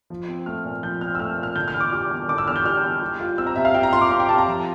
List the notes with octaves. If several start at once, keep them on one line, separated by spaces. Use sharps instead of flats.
F3
C4
A3 F6
A#2
F3 G6
C4 F6
E6
A3 F6
A#2
F6
D3 G6
F6
E2
D6
G3 D6
E2
D3 D6
E6
E2 F6
G6
G3 F6
E2
G3
F4
C4 E6
A#5
C3 E5
F5
G3 G5
A#5
F4 C6
D6
C4 C6
G5
C3 A5
A#5
F3